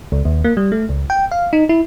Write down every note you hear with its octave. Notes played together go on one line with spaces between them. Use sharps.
C#2
D#2
A#3
G3
A3
C#2
G5
F5
D#4
E4